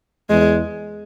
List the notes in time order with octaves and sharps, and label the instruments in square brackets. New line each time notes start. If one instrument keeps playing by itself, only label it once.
[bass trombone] E2 [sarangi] G#3